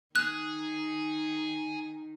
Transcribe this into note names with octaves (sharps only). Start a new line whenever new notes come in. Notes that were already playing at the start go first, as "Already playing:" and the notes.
D#3 G#4 F#6